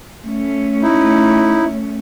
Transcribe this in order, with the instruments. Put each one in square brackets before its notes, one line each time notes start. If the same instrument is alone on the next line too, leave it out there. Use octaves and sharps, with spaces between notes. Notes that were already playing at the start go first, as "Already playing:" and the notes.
[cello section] A3 C#4
[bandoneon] D#4 E4